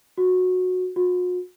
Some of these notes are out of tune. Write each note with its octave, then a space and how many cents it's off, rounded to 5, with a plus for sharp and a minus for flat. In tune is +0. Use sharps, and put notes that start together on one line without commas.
F#4 -15
F#4 -45